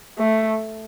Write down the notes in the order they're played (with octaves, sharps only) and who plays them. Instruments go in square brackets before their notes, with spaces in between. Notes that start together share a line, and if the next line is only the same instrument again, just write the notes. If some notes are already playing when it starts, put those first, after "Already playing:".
[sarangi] A3